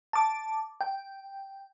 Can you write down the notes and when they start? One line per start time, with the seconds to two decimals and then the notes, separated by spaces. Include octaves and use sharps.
0.13 A5 D6
0.81 G5